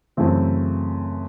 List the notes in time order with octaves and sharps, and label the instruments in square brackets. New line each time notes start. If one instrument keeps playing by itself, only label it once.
[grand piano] F#2 C#3 E3 A3 C4